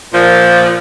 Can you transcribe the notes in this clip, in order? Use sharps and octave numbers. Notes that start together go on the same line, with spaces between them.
A#2 F3